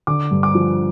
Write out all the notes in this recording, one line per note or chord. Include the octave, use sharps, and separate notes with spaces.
D3 D6
G2
D6
F3